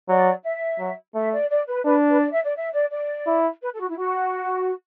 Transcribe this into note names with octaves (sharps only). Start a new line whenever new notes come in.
F#3 D5
E5
F#3
A3 E5
D5
D5
B4
D4 B4
B4
D5
E5
D5
E5
D5
D5
E4
B4
A4
F#4
E4
F#4